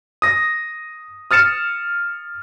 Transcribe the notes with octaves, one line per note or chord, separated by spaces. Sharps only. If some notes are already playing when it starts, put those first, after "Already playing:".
D#6 A#6
D#6 F6 A6 C#7 E7